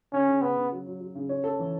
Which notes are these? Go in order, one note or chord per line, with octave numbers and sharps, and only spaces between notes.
C#3 C#4
C#3
C#3 B3
C#3
F#3
F#3
F#3
C#3
C#4
A4
E3